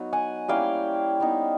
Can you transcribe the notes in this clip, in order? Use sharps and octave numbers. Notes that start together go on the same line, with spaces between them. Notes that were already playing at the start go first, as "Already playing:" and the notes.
Already playing: F#3 B3 D#4
F#5 G#5
G3 A#3 C#4 E4 F5 G5
G3 B3 D#4